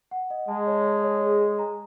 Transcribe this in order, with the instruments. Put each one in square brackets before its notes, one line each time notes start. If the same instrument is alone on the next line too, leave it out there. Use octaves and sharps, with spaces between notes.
[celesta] F#5
D#5
[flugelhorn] G#3 [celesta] A5
[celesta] C#5
A5
C#5
G#4
G#4
A#5